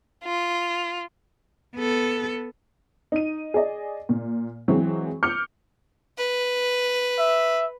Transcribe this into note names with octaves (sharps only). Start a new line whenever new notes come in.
F4
B3 A4
D#4 D#7
G#4 D5 D#5
A#2
E3 F#3 G#3 C4
D6 F6 G6 C#7
B4
E5